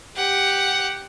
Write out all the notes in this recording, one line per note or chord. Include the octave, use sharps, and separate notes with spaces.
G4 F#5